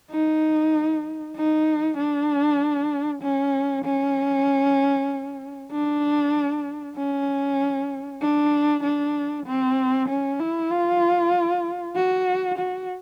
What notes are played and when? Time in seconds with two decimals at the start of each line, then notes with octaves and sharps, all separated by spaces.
0.11 D#4
1.36 D#4
1.98 D4
3.22 C#4
3.85 C#4
5.72 D4
6.97 C#4
8.22 D4
8.84 D4
9.46 C4
10.09 C#4
10.40 E4
10.71 F4
11.96 F#4
12.58 F#4